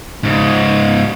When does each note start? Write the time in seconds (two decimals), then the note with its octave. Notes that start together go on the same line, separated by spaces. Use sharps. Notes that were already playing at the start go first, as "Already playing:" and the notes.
0.23 G#2 C#3